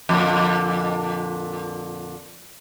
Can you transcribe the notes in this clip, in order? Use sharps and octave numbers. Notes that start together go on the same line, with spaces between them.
F2 A#2 D3